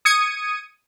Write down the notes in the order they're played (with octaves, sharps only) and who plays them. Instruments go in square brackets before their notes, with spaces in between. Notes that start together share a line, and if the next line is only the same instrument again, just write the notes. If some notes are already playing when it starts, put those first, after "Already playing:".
[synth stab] D#6 G#6 C#7 D#7